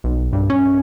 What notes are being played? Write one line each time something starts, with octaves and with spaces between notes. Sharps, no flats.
B1
G2
C#4